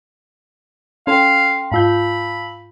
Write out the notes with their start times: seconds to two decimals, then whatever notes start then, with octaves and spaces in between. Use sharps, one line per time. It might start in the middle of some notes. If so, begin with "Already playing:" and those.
1.07 C#4 A4 F5 G5 C6
1.72 G#2 F4 F5 A5 B5 E6 G6